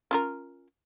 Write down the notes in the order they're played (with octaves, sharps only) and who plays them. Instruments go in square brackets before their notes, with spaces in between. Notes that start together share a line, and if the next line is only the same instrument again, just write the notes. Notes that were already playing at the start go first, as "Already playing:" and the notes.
[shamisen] C#4 F4 A#4